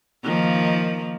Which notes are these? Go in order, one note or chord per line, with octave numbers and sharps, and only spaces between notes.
D#3 F3 A#3